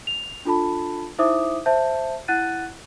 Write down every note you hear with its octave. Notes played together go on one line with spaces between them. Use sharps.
F7
D4 F4 A4 A5 B5
D#4 E4 C5 E5 D6 D#6
C5 E5 A5 G6
E4 F#5 F#6 A6 D#7